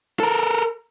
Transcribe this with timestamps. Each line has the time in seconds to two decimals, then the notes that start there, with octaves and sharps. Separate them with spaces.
0.20 A4 A#4